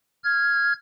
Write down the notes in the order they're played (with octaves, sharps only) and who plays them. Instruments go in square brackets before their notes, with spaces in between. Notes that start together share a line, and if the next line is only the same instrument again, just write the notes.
[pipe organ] F6 G#6